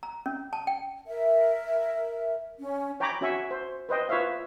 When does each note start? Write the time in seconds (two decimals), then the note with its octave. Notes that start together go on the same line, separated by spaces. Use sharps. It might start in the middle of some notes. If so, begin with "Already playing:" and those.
0.03 A#5
0.26 C#4
0.53 A5
0.67 G5
1.07 A#4 E5
2.59 C#4
3.00 C#5 G5 G#5 A#5 B5 D6
3.21 C#4 F#4 C#5 E5 G#5 C#6
3.51 C5
3.89 B4 C5 D#5 G5
4.09 F4 B4 C#5 E5 F5